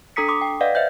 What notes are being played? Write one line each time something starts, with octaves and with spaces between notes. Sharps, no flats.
D4 A4 A#5 D#6 B6 C#7
C6 D6 D#6
G5
B4 D5 D#5 F5 F#5
C5 D#5 E5 G6